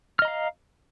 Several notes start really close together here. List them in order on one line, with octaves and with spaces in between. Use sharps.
F6 D#5 A#5 F5